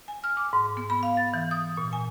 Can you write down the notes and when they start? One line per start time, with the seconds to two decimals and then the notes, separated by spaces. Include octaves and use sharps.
0.08 G#5
0.24 F6
0.37 D6
0.53 G#2
0.77 B3
0.90 B5
1.03 F5
1.17 A6
1.34 E3
1.51 D#6
1.77 A#2
1.93 G#5